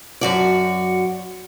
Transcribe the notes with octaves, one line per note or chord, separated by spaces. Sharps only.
F#2 F#4 D5